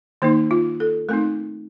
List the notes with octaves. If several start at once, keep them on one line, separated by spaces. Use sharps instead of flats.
D#3 A#3 D#4 C5
F4
A4
A3 C4 D#4 A#4